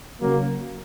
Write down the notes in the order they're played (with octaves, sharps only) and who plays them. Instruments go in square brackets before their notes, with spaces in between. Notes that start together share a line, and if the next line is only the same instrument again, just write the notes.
[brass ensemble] C#3 F#3 A#3